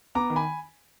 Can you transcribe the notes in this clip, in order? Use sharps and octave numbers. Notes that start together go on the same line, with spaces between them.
B3 A#5 D6
D#3
G#5 B5